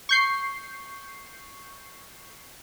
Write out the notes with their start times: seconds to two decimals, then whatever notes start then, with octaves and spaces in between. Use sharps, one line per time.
0.09 C#6 G6 C7